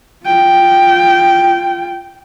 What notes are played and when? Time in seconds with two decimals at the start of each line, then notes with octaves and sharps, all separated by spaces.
0.25 F4 G5